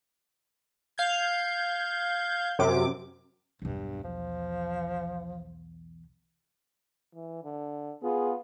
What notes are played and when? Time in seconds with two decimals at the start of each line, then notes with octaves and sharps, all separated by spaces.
0.98 F5 G6 G#6
2.59 F#2 C3 D6
3.62 B1 E2 G2
4.04 F3
7.14 E3
7.44 D3
8.03 B3 F4 G#4